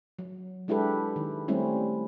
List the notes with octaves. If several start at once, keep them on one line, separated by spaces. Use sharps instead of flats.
F#3
G#3 D4 E4 G4 A4 B4
D#3
G3 A3 C4 C#4 E4